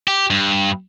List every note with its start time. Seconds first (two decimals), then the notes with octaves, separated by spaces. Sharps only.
0.08 G4
0.30 G2